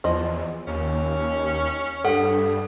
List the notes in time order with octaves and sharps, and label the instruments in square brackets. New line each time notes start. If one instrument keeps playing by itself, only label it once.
[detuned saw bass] E2 [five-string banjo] F3 D#5
[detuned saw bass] D#2 [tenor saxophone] C#4
[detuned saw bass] G2 [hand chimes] A4 [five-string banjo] F#5